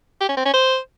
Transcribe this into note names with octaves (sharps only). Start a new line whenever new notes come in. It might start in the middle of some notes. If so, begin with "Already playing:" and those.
G4
C#4
C4
C#4
C5